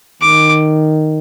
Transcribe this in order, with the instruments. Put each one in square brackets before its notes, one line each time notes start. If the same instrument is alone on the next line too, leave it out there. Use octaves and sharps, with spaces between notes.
[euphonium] D#3 [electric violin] D6